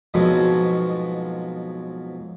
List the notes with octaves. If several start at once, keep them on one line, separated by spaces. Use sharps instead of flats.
F2 G#2 B2 F3 F#3